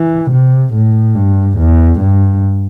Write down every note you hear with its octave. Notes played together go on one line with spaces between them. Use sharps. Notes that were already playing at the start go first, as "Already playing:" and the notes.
Already playing: E3
C3
A2
G2
E2
G2